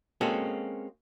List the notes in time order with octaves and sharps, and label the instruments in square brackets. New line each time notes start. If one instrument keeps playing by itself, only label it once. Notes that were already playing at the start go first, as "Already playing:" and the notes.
[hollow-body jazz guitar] G#3 A#3 C4 C#4 F#4 A4